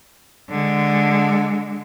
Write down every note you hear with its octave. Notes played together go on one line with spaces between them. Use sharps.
D3 G#3